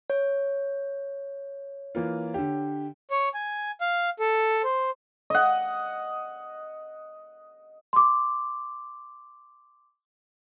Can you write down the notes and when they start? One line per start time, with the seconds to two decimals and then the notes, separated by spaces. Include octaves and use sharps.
0.10 C#5
1.95 E3 A#3 F4
2.34 D3 G4
3.11 C#5
3.34 G#5
3.81 F5
4.20 A4
4.64 C5
5.30 D#5 F#5
7.93 C6 D6